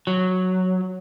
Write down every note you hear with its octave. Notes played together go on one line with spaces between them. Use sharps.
F#3